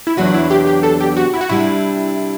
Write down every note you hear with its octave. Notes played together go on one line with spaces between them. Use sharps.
E4
E2 C3 F#3 B3 D4 F#4
E4
G4
G4
A4
G4
F#4
E4
F#4
C3 G3 D4 E4